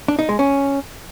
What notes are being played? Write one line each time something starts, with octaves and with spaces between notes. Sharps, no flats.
D4
D#4
G#3
C#4